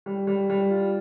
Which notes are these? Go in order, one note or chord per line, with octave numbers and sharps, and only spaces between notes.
G3
G3
G3
F4